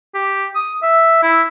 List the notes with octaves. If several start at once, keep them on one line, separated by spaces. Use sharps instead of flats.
G4
D#6
E5
E4